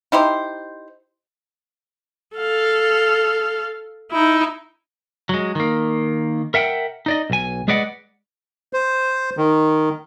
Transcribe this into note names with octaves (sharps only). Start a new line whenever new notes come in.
D#4 E4 G4 C5
A4 F5
D#4 E4
F#3 G#3
D#3 A#3
A#4 E5 F#5 G5
D#4 D5 D#5
B1 G#5
G#3 G#4 B4 D5 D#5 F#5
C5
D#3